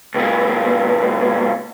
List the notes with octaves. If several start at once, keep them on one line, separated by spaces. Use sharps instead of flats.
C#2 A#2